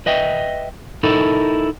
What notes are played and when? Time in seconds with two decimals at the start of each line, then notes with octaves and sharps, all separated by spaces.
0.06 B4 D#5 E5 G5
1.03 D#4 E4 A4 A#4